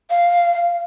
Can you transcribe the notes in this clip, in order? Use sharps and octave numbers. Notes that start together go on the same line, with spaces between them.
F5